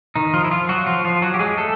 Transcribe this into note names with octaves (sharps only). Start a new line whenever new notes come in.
D#3 D#4
F3 F4
E4
F3 F4
F#3 F#4
F3 F4
F3 F4
F#3 F#4
G4
G#3 G#4
A3 A4